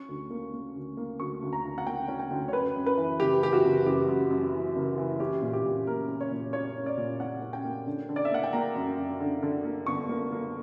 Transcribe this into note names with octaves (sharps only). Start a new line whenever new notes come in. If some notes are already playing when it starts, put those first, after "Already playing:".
Already playing: C#4 C#6
D2
A#3
A#3
D2
A#3
D2 C#6
D2
A#5
D2
F#5
A#3 G5
C#4
G5
D2
C#5
F#2 B4
F#2
B4
E3
F#1 G4
E3 G4
F#4
F#1
F#2 G4
F#2
F#2
E3
F#1
E3
C#4 G4
A#2
G4
A#2
A#3 A#4
C#4
C#5
A#2
C#4 C#5
C#4
D5
A#2
C#4 F#5
C#4
G5
A#3
D3
D3
D5
E5
A#3 F#5
G5
A#3 A#5
F#2
F#2
D3
D3
A#3
G1 C#6
A#3
A#3